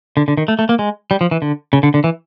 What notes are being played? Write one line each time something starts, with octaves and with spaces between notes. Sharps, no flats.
D3
D3
D#3
A3
A3
A#3
G#3
G3
F3
E3
D3
C#3
D3
D3
E3